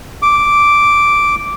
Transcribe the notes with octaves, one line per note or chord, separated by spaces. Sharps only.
D6